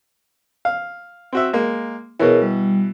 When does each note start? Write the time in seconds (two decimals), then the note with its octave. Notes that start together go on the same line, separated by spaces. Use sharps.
0.65 F5
1.33 C4 F#4 E5
1.53 G#3 A#3
2.20 B2 E3 G#4 A#4 C#5
2.42 G3